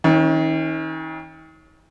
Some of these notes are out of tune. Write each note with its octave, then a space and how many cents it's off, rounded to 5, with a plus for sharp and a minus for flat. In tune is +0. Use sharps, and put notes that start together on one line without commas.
D#3 +40 C#4 -10